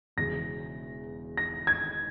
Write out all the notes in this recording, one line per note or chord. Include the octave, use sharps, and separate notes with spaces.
E1 E2 C#3 A#6
A#6
G#6